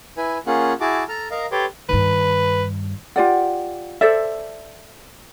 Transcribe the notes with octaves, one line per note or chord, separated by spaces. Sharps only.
E4 B4 G#5
A#3 C#4 F4 G#4 F#5
E4 F#4 G#4 A5 D6
A4 A#5 F6
A#4 D#5 F5 A#5
G4 A4 B4 C#5 C6 D6
G2 D#3 B4
F4 G4 D5 F#5
A4 C5 D5 E5